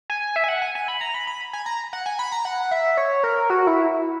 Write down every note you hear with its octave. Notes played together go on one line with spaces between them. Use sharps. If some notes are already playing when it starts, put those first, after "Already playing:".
G#5
E5
G#5
F#5
G#5
G#5
B5
A#5
B5
B5
G#5
A#5
F#5
G#5
B5
A#5
F#5
E5
C#5
A#4
F#4
E4